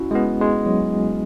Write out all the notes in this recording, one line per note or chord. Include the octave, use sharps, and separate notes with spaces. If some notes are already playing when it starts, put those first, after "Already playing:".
Already playing: C#4 E4 F#4
G#3
B3
G#3
F#3